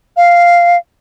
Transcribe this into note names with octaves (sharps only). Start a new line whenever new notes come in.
F5